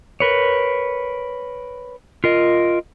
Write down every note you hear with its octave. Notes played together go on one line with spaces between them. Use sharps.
A#4 B4 C#5
F4 A#4 D#5